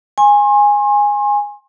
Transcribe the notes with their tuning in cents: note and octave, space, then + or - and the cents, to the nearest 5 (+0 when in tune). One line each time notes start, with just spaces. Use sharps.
G#5 -10 C6 +40